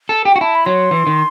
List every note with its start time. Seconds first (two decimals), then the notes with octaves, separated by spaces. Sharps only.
0.09 A4
0.25 G4
0.31 F#4 G5
0.41 E4 A5
0.55 B5
0.66 F#3 C6
0.91 E3
1.07 D#3